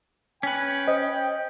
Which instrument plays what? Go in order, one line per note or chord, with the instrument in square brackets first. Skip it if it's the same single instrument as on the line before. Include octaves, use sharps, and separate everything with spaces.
[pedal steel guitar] C#4 B4 [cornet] G5
[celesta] C5 [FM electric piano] D#5